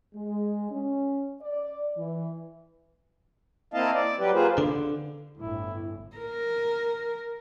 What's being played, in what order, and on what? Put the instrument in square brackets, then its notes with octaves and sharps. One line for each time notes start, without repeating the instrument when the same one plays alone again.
[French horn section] G#3
C#4
D5
E3
[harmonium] A#3 C4 E4 D#5 F5 A5
D5
F#3 G3 G4 B4
A#3 F4 G#4 B4 C5
[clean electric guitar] D3
[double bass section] G1 D2 A2 [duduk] E4
[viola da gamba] A#4